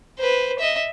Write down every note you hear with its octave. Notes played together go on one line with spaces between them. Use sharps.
B4 C5
D#5 E5